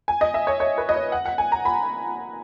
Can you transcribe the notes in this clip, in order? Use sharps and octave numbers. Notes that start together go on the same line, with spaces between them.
G#5
D#5
E5
C#5
C#5
B4
D#5
C#5
F#5
F#5
G#5
A#5
B5